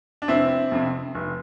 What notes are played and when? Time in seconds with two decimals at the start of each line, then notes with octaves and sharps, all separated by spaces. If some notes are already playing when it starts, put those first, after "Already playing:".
0.22 D4
0.28 F1 C4 E4
0.72 F2 C3
1.15 F1